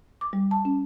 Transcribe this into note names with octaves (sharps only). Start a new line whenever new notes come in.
D6
G3
A5
C#4